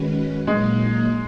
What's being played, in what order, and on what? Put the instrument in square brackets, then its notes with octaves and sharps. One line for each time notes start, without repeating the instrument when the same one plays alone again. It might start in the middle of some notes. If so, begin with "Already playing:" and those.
Already playing: [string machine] D#3 G#3 C#4 F#4 B4
[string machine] A#2 F#3 A#3 D#4 [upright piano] G#3